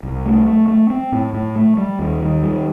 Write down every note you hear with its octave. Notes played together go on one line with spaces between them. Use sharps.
C2
A3
A3
A3
C4
A2
A2
A3
G3
D#2
D#3
G3